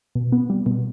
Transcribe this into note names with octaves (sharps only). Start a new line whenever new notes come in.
B2
B3
G3
B2